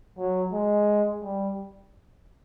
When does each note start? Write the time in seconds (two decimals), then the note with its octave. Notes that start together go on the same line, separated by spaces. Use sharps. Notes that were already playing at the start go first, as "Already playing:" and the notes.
0.18 F#3
0.53 G#3
1.23 G3